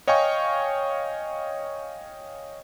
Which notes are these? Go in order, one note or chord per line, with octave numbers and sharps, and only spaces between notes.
C#5 D#5 F5 G5 G#5 C#6